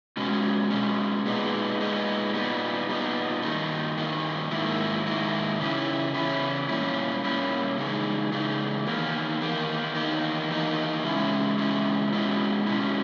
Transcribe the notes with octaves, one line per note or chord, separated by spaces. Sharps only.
B2 G#3 C#4
B2 G#3 C#4
A#2 G#3 B3 D#4
A#2 G#3 B3 D#4
A#2 G3 B3 D#4
A#2 G3 B3 D#4
G2 D#3 A#3 D#4
G2 D#3 A#3 D#4
G#2 D#3 A#3 E4
G#2 D#3 A#3 E4
C#3 E3 C#4 E4
C#3 E3 C#4 E4
A#2 G3 A#3 C#4 E4
A#2 G3 A#3 C#4 E4
C#3 E3 G#3 D#4
C#3 E3 G#3 D#4
E2 D#3 A#3
E2 D#3 A#3
E2 D#3 A#3 D#4
E2 D#3 A#3 D#4
E2 C#3 G#3 C#4 E4
E2 C#3 G#3 C#4 E4
B2 G#3 C#4 E4
B2 G#3 C#4 E4